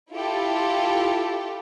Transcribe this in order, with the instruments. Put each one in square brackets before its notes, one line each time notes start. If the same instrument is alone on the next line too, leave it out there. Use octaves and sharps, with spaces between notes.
[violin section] E4 F4 G4 A4